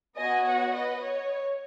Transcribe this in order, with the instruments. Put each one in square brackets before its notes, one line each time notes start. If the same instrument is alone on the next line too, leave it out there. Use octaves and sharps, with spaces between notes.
[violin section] B3 F#4 D#5 G#5
C#5 F#5
B4 D#5
C#5